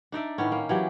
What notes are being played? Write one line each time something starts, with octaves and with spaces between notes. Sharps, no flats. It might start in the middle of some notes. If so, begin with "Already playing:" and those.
D4 D#4 D5 E5
A2 D#3 B3 C#4
A#3
E3 F#3 G4